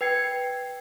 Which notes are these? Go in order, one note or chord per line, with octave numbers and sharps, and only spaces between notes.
B4 G5 G#6 C7 C#7